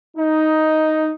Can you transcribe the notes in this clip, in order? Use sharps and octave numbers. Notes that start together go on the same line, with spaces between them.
D#4